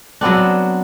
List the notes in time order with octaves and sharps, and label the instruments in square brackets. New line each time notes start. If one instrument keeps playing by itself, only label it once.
[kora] F#3 B3 C4 D4